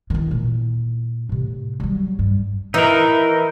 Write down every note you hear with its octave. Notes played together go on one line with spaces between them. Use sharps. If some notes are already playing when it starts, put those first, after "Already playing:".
D#3 E3
A#2 E4
A2 C3
F#3 G3
G2
E3 D#4 A#4